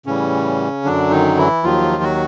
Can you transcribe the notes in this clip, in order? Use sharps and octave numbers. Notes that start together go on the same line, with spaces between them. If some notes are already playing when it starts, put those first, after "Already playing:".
A2 C#3 E3 G3 C#4
F#2 D3 F#3 D4
D#3 D#4
E3 E4
D#2 D#3 F3 F#3 F4
F#3 F#4